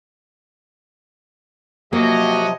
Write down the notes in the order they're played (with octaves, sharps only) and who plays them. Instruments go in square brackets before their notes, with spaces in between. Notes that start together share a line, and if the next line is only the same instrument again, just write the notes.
[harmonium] C3 F3 [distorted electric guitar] F#3 [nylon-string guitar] A#3 [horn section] G4 C#5 D#5